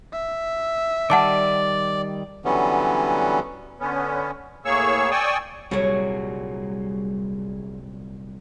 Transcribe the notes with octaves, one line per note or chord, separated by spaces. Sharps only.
E5
D#3 G3 D5 F#5 A5 D6
D3 E3 F#3 G3 B3 C#4
D3 B3 C#4
A2 A#3 G#4 C#5 C#6 E6
D5 G5 G#5 C#6 D#6 E6
C2 A#2 F#3 G3 G#4 C#5